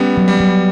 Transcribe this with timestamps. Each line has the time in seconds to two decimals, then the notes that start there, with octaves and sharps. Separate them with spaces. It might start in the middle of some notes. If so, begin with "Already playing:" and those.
Already playing: G3 B3 C#4
0.17 F#3
0.28 G3
0.40 F#3